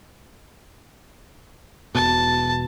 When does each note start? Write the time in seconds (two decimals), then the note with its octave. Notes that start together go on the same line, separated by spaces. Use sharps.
1.95 E1 B2 A5